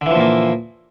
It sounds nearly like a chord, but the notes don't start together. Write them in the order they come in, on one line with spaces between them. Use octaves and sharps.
D3 E3 F3 A#2 A#3